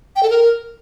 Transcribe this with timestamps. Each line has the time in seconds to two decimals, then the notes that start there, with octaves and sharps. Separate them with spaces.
0.16 G5
0.23 A4
0.30 A#4